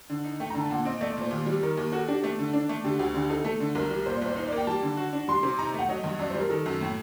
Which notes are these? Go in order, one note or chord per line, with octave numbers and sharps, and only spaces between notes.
D3
D#4
A3 G5
D3 A#5
A5
A#2 F#5
C4 D#5
A3 D5
D5
A#2 C5
D#2
G3
D#3 A#4
D#2
F#4 A4
D4 G4
A3 A4
D3
D4
A3
D3 G4
D2 F#4
D3 G4
D#4 A4
A3 A4
D3
C2 A#4
G3
A#2 C5
D5
C2 C5
D#4 C5
A#3 D5
G5
G3 A5
D3
F#4
D4
G3 C6
C3
D#4 A#5
A3 F#5
F#3 D#5
G2
F#2 D5
G3 C5
A#4
D#3 A4
F#2
A2